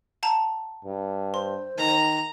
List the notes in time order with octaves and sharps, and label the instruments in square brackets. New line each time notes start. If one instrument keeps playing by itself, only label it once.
[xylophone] F#5 A5 A#5
[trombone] G2
[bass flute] C5 [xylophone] C6
[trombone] D#3 [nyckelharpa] A#5